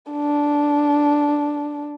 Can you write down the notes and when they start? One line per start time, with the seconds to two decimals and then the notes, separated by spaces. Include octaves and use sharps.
0.12 D4